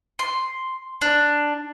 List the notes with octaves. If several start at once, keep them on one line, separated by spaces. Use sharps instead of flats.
C6
D4